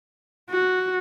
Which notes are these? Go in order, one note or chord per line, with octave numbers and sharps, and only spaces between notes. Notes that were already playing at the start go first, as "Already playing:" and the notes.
F#4